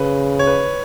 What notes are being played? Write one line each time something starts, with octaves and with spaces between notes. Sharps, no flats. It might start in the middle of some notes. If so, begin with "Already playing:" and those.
Already playing: C#3 B4
C#5
B4